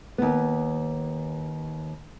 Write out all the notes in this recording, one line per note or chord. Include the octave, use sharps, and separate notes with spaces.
D#2 B3